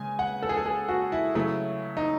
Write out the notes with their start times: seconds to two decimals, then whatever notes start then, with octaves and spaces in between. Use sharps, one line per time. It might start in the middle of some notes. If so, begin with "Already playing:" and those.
Already playing: C#3 G#3 G#5
0.19 F#5
0.43 A4
0.49 G#4
0.57 A4
0.66 G#4
0.89 F#4
1.12 E4
1.35 C#3 F#3 A3 E4
1.97 D#4